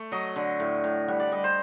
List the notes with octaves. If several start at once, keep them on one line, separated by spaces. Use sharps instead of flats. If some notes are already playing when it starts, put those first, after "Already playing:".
Already playing: A3
F#3 D#5
D3
A2
A2
G3 F#5
D5
G3 D#5
C5